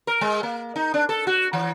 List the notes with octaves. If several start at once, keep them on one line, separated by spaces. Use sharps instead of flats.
A#4
G#3
A#3
D#4
D4
A4
F#4
E3